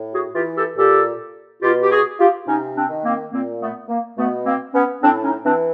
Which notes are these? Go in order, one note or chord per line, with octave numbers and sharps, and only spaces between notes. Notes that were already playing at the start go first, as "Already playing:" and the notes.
Already playing: A2
F#4 G#4
E3 F4 G4
G4 A4
A#2 G4 A4
B2 F4 G4
G4
F#4 G#4
F4 G4
C3 C#4 D#4
C4 D4
D#3
A#3 C4
A#2 A#3 C4
A3 B3
A#3
B2 A3 B3
A#3 C4
B3 C#4
A2 C4 D4
C#4 D#4
E3 C4 D4